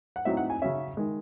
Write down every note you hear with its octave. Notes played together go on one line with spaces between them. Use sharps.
F#5
A2 F#3 C4 D#4 E5
F#5
G#5
C#3 F#3 C#4 E5
D#3 G#3